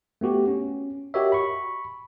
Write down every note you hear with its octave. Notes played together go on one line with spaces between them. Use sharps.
A3 B3 F#4 G4
C#4
F#4 G4 A#4 C#5 D#5 E5
B5 C#6